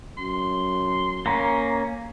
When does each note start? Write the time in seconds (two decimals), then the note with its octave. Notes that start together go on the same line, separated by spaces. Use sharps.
0.17 F#2 C6
1.26 A#3 C#4 A#5